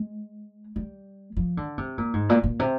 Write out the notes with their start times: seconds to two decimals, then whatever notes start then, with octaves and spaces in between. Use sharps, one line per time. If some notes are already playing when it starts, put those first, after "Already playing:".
Already playing: G#3
0.76 G3
1.37 F3
1.57 D3
1.78 C3
1.98 A#2
2.13 G#2
2.29 A#2
2.44 A#2
2.59 C3